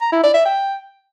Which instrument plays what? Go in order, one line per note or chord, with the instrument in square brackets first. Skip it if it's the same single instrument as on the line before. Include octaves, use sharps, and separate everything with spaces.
[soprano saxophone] A#5
E4
D5
E5
G5